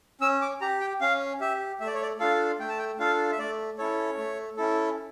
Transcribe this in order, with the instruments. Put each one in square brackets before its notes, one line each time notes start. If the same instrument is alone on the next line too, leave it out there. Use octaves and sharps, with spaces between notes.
[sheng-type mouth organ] C#4 E6
D6
G4 A#5
G5
C#4 F5
G4 E5
A3 E5
D5
C#5
D5
D4 F4 A4 F5
A3 G5
A5
G5
D4 F4 A4 F5
E5
A3 D5
C#4 E4 A4 C#5
A3
C#4 E4 A4